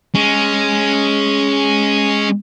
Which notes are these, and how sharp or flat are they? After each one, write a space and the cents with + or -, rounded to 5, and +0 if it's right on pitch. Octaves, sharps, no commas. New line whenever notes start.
G#3 +0 C#4 +0